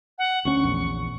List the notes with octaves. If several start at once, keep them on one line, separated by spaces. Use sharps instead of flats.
F#5
D2 C#4 C#6
A#1 E2